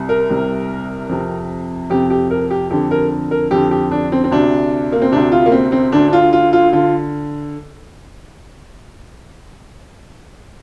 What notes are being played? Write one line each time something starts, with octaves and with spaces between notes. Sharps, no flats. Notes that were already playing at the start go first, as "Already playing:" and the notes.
Already playing: C2 C3
A#4
C2 C3
F2 C3
F2 C3 G4
G4
A#4
G4
F2 D3 G4
A#4
A#4
F2 D3 G4
G4
D4
C4
C4
D2 C3 D4
A#3
C4
D2 C3 D4
F4
A#3
C4
C4
D2 D3 D4
D4
F4
F4
F4
D3 F4